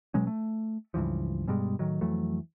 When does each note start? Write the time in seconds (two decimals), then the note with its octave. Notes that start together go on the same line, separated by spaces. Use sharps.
0.14 B2 F#3 G#3 C#4
0.27 A3
0.94 C#2 G2 E3 F3
1.48 G2 B2 G3 G#3
1.79 A2 D#3 F#3
2.01 F2 E3 F#3 A3